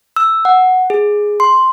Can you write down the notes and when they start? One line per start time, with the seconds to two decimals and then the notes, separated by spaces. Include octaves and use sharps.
0.16 E6
0.45 F#5
0.90 G#4
1.40 C6